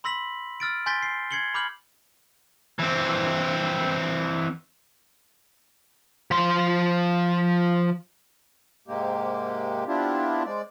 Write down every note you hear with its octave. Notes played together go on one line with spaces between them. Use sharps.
B5 C6 E6 A#6 B6 F#7
E6 F6 A6 D7
G#5 C6 G6 A6 B6 G7
C7
G#6 C7 C#7 F#7 G7
B5 D6 F6 G6 F#7
E3 C4
F3 C6
G#2 C3 G#3 A#3 G4
B3 C4 D4 E4 F4 G4
G#3 C4 D5